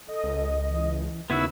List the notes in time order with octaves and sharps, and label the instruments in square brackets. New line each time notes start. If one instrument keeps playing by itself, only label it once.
[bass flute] A4 [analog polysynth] D#5
[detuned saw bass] C#2
[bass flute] E3
[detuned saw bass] D#2 [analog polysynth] C#3 E6 [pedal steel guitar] B3 E4 F#4 [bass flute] D#4